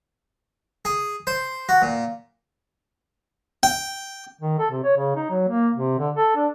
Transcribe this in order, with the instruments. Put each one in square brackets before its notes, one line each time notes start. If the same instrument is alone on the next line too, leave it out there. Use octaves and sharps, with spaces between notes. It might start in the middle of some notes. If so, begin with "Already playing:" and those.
[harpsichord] G#4
C5
F#4
A#2
G5
[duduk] D#3
A4
C3
C#5
C#3
D#4
F#3
A#3
C3
D3
A4
D4